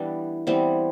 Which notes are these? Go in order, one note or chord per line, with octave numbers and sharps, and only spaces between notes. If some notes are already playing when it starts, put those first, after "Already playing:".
Already playing: E3 G3 B3 D4 E4
E3 G3 B3 C4